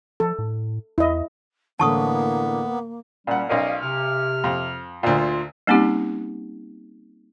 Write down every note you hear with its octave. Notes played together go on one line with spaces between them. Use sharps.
F3 A4
A2
E2 E4 D#5
A2 D3 E3 A#3 B3 A5 C#6 D#6
A#2 G3 C#4 F#5
B1 C#4 A#4 D5 D#5 F5
C3 F6
F2
D2 A#2 F4
G3 A#3 C4 C#4 D#4 G4